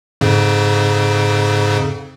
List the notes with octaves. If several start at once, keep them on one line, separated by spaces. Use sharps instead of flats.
F2 G#2 C#3